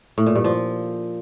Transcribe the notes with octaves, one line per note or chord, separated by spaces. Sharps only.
A2
A#2
G2
F3